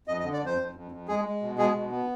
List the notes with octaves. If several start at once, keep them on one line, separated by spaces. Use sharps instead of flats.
F2 D#5
D#5
D3
D5
F2 C5
F2
F2
F2
G#3 G#4
G#3
B2
G#3 G#4
B2
B3